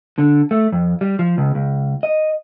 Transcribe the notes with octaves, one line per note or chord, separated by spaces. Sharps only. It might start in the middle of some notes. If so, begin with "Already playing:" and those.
D3
A3
F2
G3
F3
C#2
C#2
D#5